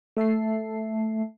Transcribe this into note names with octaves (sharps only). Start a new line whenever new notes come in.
A3 E5 A5 C7